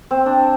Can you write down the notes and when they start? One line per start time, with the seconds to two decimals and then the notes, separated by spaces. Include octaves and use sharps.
0.11 C4
0.26 D4